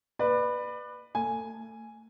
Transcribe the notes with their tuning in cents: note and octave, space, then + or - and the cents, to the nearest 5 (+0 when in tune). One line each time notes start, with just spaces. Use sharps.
B4 +0 D5 +30
A3 +35 G#5 +0